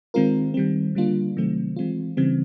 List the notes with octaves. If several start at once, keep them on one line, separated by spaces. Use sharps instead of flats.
D#3 G#3 C4 F4 A#4
D#3 G3 C4
D3 G3 A#3 D4 F4
C3 D#3 F#3 A3 C4
E3 G#3 C4 F4
C#3 E3 G3 C4